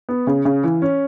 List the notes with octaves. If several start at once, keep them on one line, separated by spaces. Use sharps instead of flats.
B3
C#3
C#3
E3
C#4